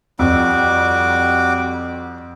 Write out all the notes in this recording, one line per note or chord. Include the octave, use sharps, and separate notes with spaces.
F2 G3 F#4 D6